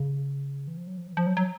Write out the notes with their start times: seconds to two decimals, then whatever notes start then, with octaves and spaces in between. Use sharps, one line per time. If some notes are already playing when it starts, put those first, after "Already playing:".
Already playing: C#3
0.68 E3
0.77 F3
0.87 F#3
0.97 F3
1.07 F#3
1.13 E3
1.17 F3
1.27 F#3
1.37 F#3